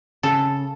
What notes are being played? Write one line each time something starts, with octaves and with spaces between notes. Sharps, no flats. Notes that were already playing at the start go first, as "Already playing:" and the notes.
C#3 A4